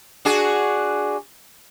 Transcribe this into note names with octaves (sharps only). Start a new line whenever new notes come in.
D4 F#4 G#4